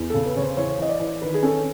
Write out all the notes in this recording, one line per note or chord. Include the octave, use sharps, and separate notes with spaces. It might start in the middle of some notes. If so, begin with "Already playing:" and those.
Already playing: E2
C#3 A4
B4
C#3 C#5
C5
E3 C#5
E3 D#5
D5
E3
D#3 B4
G#4
C#4 A4